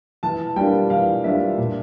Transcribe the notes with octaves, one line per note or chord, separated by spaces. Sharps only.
E3 A5
G3 A#3 D4 F4 G5
E3 F5
G3 A#3 D4 F4 E5
A#2